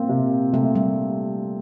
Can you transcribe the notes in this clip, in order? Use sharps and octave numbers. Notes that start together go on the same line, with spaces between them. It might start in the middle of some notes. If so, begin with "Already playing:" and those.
Already playing: A#3 C4
C3
C3 A3
G3